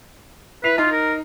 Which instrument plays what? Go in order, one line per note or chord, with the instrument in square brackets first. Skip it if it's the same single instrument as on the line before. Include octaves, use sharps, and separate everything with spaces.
[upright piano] E4 C7 F7 [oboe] B4
[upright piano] D#4 [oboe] F4
[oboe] A#4